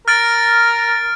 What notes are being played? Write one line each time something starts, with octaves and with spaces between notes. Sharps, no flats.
A#4 F6 A6 D7